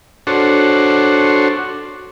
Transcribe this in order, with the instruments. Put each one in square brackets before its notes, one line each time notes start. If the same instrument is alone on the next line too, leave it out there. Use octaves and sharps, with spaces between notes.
[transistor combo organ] D4 F#4 A4 C5 C#5